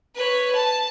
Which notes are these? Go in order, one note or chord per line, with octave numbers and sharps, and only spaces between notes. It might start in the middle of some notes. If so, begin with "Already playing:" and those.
B4 C#5
A5